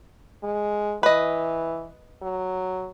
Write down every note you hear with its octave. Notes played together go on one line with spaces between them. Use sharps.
G#3
E3 B4 D#5
F#3